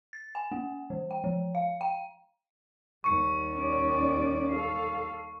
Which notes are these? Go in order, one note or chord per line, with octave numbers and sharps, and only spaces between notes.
A6
G#5
A#3
E3
G5
F3
F5
G5
D#2 G3 C#6 C#7
C#4 D5
A4 F5